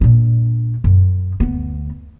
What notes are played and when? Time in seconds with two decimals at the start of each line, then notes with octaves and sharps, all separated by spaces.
0.01 A#2 D4
0.84 F#2
1.40 D2 B3